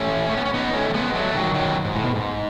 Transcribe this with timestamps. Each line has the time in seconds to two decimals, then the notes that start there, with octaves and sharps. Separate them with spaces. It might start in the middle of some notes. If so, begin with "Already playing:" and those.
Already playing: A3 C#4
0.30 A3
0.37 B3
0.45 C#4
0.54 B3 D#4
0.74 A3 C#4
0.89 C#4
0.94 G#3 B3
1.14 F#3 A3
1.34 D#3 F#3
1.54 D#3 F#3
1.85 G#2
1.95 A2
2.04 B2
2.15 G#2